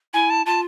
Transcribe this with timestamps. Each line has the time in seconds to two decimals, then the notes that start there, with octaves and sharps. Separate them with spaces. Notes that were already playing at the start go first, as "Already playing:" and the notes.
0.14 E4 G#5
0.30 A5
0.46 F4 A5